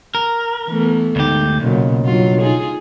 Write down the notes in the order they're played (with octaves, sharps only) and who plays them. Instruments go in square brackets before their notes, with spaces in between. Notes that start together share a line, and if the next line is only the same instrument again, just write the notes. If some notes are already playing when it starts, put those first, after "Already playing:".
[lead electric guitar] A#4
[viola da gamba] E3 A3 B3
[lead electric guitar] D2 G4 [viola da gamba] G#2
[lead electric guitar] B1 [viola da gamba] A#2 C#3 F#3
[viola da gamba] G2 F#3 F4
D#4 F4 G#4